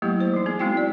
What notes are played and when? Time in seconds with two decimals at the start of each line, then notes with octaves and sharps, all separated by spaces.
0.02 F#3 A3 A#3 E4 G4
0.20 C5
0.34 E3 D#4
0.46 B3 G#4
0.59 G#3 C4 D#4 E4 F#4 G5
0.77 D5